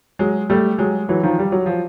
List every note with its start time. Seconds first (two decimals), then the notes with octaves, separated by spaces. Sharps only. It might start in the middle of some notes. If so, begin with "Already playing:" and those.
0.19 F#3 G#3
0.50 G3 A3
0.79 F#3 G#3
1.09 E3 F#3
1.23 D#3 F3
1.39 G3
1.52 F#3
1.66 F3